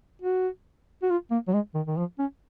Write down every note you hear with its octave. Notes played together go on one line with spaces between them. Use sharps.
F#4
F#4
F4
A#3
F#3
G#3
D#3
D#3
F3
C#4